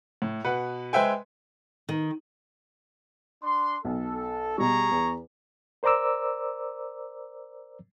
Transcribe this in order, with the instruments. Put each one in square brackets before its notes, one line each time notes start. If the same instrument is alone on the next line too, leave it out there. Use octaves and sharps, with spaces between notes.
[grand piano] A2
B2 B4 F#5
G#3 B4 C5 E5 G5 G#5
[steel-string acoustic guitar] D#3
[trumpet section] D4 C6
[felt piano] B1 [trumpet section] A4
[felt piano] B2 G3 [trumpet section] G#4 A#5 C#6
[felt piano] E2
[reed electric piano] A#4 C5 D5 A#5 D6 E6